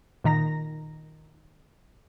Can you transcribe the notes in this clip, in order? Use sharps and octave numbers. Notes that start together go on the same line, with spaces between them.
A#2 D#3 A#5 A#6